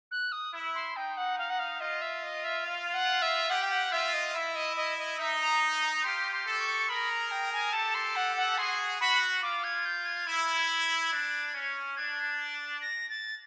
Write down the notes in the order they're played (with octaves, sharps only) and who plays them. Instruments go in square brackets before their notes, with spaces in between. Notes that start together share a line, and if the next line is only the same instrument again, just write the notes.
[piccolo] F#6
D#6
[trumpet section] E4
[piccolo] C6
[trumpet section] D#4 [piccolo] G5
[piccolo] F#5
F5
F#5
F5
[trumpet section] F4 [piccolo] D#5
[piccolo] E5
D#5
E5
F5
F#5
E5
[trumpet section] F4 G4 [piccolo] F#5
[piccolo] G5
F#5
[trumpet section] F4 [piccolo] E5
[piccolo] D#5
[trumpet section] E4 [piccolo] E5
[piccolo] D#5
D#5
D#5
[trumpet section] D#4 [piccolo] E5
[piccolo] A#5
A#5
[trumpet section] F4 G4 [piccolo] C6
[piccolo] C6
[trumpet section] G4 A4
[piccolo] C#6
[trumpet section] G#4 A#4 [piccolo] B5
[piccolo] A#5
G5
G#5
[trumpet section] G4 A4 [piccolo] A5
[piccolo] C6
F#5
F#5
[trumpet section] F#4 G#4 [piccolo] C6
[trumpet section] F#4 [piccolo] B5
[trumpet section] F4 [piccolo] D6
[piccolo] G#6
G6
G#6
[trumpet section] E4
D4
C#4
[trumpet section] D4 [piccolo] G#6
[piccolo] A6
A#6
A6